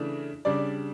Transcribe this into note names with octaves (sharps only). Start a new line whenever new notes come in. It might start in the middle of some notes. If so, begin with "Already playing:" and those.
Already playing: C#3 E3 A3 D4
C#3 G3 D4 D5